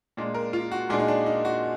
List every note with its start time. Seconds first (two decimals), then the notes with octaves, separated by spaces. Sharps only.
0.17 A#2 G#3 D4
0.34 A#4
0.53 F4
0.71 F#4
0.90 A#2 G#3 D4 G#4
1.00 D#4
1.08 D4
1.26 D#4
1.45 F#4